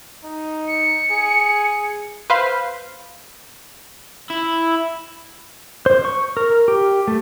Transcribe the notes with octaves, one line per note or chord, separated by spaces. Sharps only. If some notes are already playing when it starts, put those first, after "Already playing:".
D#4
C#7
G#4
B4 C5 F5
E4
C5
C#6
A#4
G4
A3